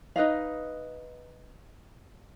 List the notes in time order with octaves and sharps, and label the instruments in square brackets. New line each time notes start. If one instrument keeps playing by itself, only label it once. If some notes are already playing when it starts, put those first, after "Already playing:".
[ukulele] D#4 B4 D#5 F5